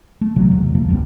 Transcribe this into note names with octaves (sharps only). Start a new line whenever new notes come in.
A3
A#1 C3 E3 F#3
E2
F2 C3 F3 A#3
G#1 C#2 G2 A3